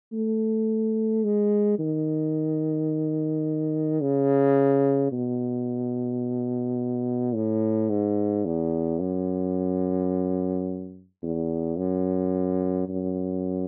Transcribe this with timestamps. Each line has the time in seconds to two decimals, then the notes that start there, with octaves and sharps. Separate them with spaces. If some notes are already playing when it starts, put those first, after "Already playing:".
0.13 A3
1.24 G#3
1.79 D#3
4.01 C#3
5.12 B2
7.35 A2
7.90 G#2
8.45 E2
9.01 F#2
11.23 E2
11.78 F#2
12.89 F#2